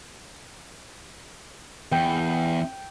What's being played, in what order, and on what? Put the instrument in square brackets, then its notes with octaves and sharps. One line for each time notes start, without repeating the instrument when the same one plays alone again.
[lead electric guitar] E2 [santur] G5